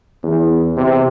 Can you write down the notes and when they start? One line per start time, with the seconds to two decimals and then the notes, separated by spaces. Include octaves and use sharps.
0.23 E2
0.77 C3